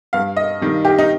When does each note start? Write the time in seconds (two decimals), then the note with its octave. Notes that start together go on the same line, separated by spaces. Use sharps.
0.13 G2 F5
0.37 D#5
0.61 D#3 G3
0.85 G4
0.98 D#4